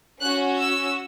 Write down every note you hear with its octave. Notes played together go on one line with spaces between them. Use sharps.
C#4 F#4 F#6
E6